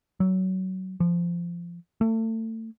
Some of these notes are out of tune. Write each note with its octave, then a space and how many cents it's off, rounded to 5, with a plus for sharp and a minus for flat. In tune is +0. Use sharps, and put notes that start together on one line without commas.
F#3 +20
F3 -20
A3 +30